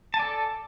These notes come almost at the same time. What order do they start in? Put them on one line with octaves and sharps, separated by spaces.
A5 G#5 D5 A4